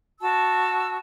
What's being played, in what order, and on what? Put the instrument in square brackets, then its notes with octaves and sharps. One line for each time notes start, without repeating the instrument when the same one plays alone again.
[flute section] F#4 A5 E6